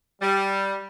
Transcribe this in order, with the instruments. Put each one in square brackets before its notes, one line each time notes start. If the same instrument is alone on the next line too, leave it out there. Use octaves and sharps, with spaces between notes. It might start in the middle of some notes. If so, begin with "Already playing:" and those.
[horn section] G3